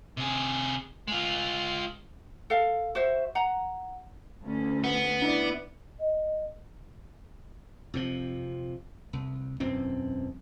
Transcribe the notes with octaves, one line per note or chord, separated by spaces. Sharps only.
C3 G#4
G#3 F4
A4 F5
F#4 C5 E5
F#5 A#5
D2 E3 C#4
B3
D4 E4 D5
D#5
F2 C3 F3
C2
E1 F#2 E3 C4